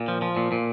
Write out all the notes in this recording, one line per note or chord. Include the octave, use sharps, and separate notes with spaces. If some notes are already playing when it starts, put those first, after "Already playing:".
Already playing: A#2
F3
F3
A#2
A#2